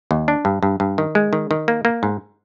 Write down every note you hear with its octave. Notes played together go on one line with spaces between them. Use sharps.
D#2
D4
G2
G2
G2
D#3
G#3
D#3
D#3
A#3
A#3
G#2